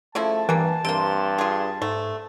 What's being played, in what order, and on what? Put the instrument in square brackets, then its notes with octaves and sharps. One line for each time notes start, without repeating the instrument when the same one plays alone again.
[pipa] C#3 F3 E4 [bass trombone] A3 [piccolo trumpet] A5
[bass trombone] G2 [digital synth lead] E3 [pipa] G3 A#3
[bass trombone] G2 [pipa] C3 A#3 [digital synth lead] C6
[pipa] F4 G#4
[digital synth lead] G#2 [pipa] A3